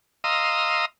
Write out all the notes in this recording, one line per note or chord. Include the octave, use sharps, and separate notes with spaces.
D#5 F5 A#5 C6 D#6 E6